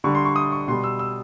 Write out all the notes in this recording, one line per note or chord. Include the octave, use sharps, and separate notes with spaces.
D3 G3 C#6
C6
C#6
D#6
C#6
B2 G3 C6
E6
E6